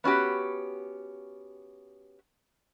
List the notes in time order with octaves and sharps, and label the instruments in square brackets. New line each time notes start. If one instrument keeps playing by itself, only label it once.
[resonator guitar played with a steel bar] B3 C#4 F#4 G4